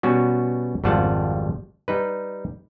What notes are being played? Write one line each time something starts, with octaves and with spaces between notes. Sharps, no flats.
B2 G3 B3 C#4 F#4
G#1 F2 G3 F4 F#5 A5
G3 D#4 B4